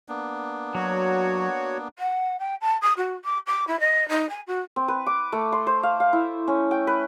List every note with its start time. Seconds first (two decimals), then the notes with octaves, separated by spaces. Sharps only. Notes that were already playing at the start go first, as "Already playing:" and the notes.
0.09 A#3 B3 D4
0.75 F#3 F#4 C#5
1.98 F#5
2.39 G5
2.61 A5
2.81 D#6
2.97 F#4
3.24 D6
3.46 D6
3.67 E4
3.80 D#5
4.08 D#4
4.29 G#5
4.47 F#4
4.76 C4
4.88 B4
5.06 D6
5.32 A3
5.52 C6
5.67 C5
5.83 F5
6.00 F5
6.13 E4
6.48 C#4
6.71 G5
6.87 B4